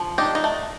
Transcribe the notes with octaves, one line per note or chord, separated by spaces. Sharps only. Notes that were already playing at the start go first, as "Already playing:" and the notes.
Already playing: F3
D4 D#4 G4
D#4
A3